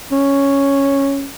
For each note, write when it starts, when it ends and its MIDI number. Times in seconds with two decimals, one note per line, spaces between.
0.12 1.28 61